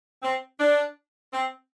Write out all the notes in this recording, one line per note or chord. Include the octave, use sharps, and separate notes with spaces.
C4
D4
C4